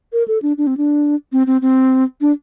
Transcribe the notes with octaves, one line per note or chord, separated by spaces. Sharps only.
A#4
A4
D4
D4
C4
D4
C4
C4
C4
D4